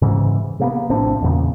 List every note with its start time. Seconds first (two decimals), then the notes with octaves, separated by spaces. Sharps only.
0.02 G#2 C#3 E3
0.59 C3 A#3 B3
0.90 A#1 A2 C4 D4
1.22 E2 A#2 C#3